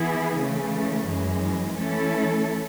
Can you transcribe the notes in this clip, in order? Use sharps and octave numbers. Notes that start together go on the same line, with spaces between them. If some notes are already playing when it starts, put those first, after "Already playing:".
Already playing: E3 B3 E4 G#4
C#3 E3 A3
F#2 E3 G#3
E3 A3 C#4 E4 A4